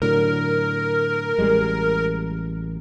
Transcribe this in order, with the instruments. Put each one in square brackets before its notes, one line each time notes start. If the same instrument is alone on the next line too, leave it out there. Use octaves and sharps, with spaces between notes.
[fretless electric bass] A2 D3 F#3 [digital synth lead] A#4
[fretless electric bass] A1 G3 G#3